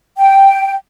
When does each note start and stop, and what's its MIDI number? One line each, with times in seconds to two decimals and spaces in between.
0.18 0.74 79